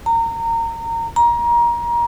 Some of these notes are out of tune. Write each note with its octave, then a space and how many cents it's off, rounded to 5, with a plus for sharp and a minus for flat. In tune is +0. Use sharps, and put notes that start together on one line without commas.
A#5 -25
A#5 +25